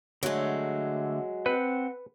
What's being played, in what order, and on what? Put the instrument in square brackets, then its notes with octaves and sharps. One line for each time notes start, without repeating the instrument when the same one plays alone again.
[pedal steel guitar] D3 A3 [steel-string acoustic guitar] F#3 G#3
[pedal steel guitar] C4 F#5 [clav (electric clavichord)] B4